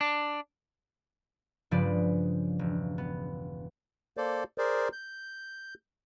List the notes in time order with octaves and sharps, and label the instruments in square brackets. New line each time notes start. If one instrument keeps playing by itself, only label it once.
[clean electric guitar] D4
[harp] G2 C#3 F3 G#3 B4 D5
E1
B3
[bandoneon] A#3 A4 C5 D5
G#4 A#4 C5 D5
G6